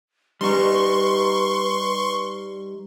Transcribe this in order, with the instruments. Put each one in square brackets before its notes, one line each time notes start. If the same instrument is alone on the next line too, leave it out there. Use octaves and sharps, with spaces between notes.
[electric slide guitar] G3 D#4 [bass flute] B4 [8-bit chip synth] C6 C#6